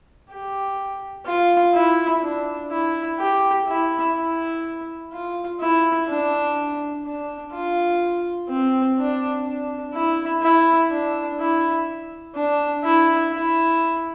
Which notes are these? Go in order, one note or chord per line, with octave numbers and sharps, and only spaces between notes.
G4
F4
E4
D4
E4
G4
E4
E4
F4
E4
D4
D4
F4
C4
D4
D4
E4
E4
D4
E4
D4
E4
E4